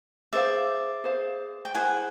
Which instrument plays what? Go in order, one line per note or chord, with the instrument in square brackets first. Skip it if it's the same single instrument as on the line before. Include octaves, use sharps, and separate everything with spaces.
[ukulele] G#4 C5 F5 [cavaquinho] D5 E5
[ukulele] G#4 C5 F5
[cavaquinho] G5
[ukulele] E4 G#4 C5 [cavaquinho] F#5 G#5